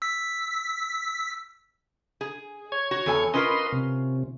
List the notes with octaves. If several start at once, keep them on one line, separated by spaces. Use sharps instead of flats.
E6 B6
G#4
C#5 G#6
F#4
E2 A4 G#5
C#4 F4 A#4 B4 D#5 C6
C3